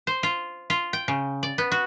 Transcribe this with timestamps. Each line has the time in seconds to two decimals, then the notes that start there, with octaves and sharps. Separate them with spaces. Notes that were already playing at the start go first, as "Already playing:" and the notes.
0.07 C5
0.23 F4
0.70 F4
0.93 G5
1.08 C#3
1.43 D5
1.58 B3
1.72 F#4